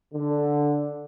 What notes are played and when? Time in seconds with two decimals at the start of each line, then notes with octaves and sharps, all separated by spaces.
0.14 D3